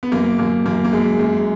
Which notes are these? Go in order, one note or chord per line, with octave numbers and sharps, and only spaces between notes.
B3
F#2 A#3
F#2 A#3
F#2 A#3
A#3
F#2 G#3
F#2 G#3